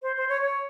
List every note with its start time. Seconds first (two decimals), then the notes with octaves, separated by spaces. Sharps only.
0.02 C5
0.16 C5
0.28 C#5
0.41 C#5